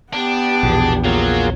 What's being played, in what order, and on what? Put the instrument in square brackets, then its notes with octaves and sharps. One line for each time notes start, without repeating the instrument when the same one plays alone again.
[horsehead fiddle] B3 G4 [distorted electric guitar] D4
[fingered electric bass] A#1 E2 [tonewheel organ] B2 G#4
[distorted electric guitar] F#3 [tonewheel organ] A#3 F4 G#4